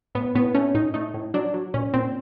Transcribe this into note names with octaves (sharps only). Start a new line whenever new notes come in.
A2 B3
A2 B3
A3 C#4
A2 D#4
A3 D#4
A2
F#3 D4
F#3
A#2 C#4
A#2 C4